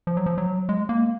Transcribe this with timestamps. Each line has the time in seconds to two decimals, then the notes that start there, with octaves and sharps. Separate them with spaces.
0.07 F3
0.17 F#3
0.26 F3
0.38 F#3
0.69 G#3
0.89 A#3